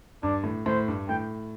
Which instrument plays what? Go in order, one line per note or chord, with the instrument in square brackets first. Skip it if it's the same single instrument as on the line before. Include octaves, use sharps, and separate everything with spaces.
[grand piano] G2 [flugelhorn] D4
[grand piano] A2
[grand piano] A2 [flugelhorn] C5
[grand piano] G2
[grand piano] A2 [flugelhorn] G5